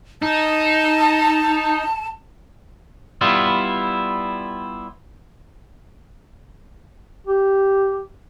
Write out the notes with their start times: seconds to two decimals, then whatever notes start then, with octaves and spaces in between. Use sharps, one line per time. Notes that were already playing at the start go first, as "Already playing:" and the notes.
0.22 D#4 A5
3.21 G3 B3 E4 F4
7.27 G4